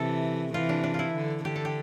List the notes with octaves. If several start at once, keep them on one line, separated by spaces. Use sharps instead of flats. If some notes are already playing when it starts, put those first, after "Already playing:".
Already playing: C3 E3 A4
C3 E3 F4
D4
D4
E4 F4
D3
D3 G4
A4
G4